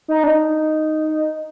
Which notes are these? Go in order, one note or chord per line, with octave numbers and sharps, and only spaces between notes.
D#4
D4
D#4